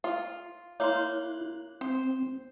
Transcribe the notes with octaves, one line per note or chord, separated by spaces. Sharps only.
F4
A#3 E4 C#5 F5 C6 F#6
C4 C5